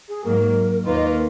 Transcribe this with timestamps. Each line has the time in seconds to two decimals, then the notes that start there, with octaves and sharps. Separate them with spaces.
0.08 G#4
0.24 G#2 F#3 A#3 A#4
0.85 D#2 D#3 A#3 F4 B4
0.95 D#5
1.06 B4